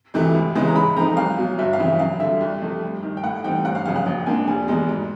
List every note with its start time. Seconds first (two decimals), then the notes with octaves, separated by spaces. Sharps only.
0.14 D2 C3 E3 A3
0.35 C#2
0.55 C#3 E3 G#3 B3
0.68 A#5
0.76 G#2 B5
0.96 F3 A3 C4 D#4 A#5
1.17 C2 F5
1.38 B2 F#3
1.58 G1 E5
1.73 F5
1.79 F2 C#3 E3 E5
1.99 F#2 F5
2.20 D3 G3 E5
2.41 C2
2.62 C3 F3 A3
2.83 G2
3.03 D#3 G3
3.17 G5
3.24 A2 F#5
3.44 E3 G3 C4 D#4 G5
3.65 G1 F#5
3.75 F5
3.85 F#2 C#3 F3 F5
3.96 F#5
4.06 A#1
4.26 G#2 F3 A#3 D4 G#5
4.47 F1 G#5
4.68 E2 B2 G#3
4.89 G#2